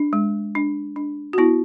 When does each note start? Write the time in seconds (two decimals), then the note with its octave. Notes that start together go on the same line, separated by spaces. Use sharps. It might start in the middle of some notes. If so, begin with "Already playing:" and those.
Already playing: D4
0.13 G#3
0.55 D4
0.96 D4
1.33 F#4
1.38 B3 E4